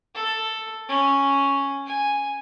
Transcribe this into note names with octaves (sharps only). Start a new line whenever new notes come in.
A4
C#4
G#5